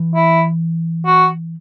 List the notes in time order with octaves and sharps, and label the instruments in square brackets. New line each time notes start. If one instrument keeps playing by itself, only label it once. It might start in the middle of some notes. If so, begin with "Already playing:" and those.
Already playing: [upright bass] E3
[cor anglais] E4
F#4